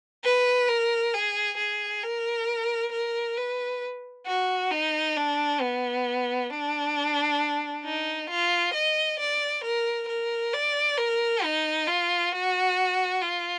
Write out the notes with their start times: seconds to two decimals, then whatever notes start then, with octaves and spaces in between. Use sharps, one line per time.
0.24 B4
0.69 A#4
1.14 G#4
1.58 G#4
2.03 A#4
2.92 A#4
3.37 B4
4.27 F#4
4.71 D#4
5.17 D4
5.61 B3
6.50 D4
7.85 D#4
8.30 F4
8.74 D#5
9.19 D5
9.64 A#4
10.09 A#4
10.53 D5
10.97 A#4
11.43 D#4
11.87 F4
12.32 F#4
13.22 F4